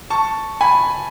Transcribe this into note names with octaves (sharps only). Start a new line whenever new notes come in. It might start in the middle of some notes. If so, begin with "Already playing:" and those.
A5 C#6
G#5 B5